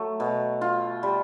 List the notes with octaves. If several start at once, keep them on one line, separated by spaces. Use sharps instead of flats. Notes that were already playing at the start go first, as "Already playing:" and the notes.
Already playing: F#3 A3
B2
F4
G3